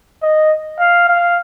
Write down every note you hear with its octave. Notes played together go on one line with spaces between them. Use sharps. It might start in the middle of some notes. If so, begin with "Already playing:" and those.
D#5
F5
F5